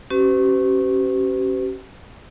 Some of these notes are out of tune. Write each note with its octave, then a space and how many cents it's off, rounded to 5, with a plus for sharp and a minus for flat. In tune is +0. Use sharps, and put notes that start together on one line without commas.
C#4 -20 G4 -40 B4 +45